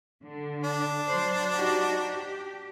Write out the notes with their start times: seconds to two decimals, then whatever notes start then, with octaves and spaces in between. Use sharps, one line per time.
0.23 D3
0.64 D4
1.07 F#3 C5
1.54 D#4 F#4 G4
1.95 G4